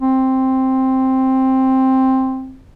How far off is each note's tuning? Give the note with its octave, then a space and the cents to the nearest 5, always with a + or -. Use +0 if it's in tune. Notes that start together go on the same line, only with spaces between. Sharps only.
C4 +5